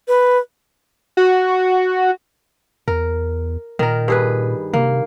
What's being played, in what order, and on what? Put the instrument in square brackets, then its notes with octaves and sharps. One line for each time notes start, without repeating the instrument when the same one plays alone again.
[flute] B4
[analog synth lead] F#4
[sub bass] E2 [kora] A#4
[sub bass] A#2 [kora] D#3 A#4
[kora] G2 G#4 B4
[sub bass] C3 [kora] A#3